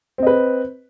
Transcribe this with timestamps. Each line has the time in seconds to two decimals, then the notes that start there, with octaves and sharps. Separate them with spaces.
0.18 C4
0.23 D#5
0.27 B4